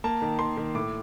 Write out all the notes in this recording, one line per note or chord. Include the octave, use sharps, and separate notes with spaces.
A#3 A5
D#3
D#3 C6
D#3
A2 D6